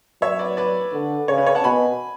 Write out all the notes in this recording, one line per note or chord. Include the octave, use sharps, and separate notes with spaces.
F#3 C#5 E5
B4 D5
B4 D5
D3
C#3 C#5
B4
C#5
F#5 A5
B2 G#5 B5